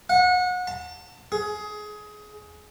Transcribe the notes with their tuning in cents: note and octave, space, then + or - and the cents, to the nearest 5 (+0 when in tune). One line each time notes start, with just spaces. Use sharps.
F#5 -30
A5 +35
G#4 +20